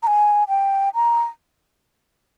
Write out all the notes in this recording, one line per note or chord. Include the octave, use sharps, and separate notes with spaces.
A#5
G#5
G5
A#5